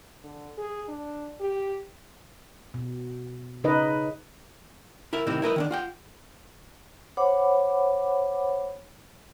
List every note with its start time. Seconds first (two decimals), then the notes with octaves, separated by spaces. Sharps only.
0.24 D3
0.57 G#4
0.88 D4
1.40 G4
2.74 B2
3.64 C#3 D#4 B4 D#5
5.13 E4 A#4 E5
5.27 A2 C3 D#3 C4 E4
5.42 E4 A#4 B4 D#5
5.56 D#3 C#4 D4
5.71 F4 F#5 G5
7.17 C5 C#5 F#5 B5 D6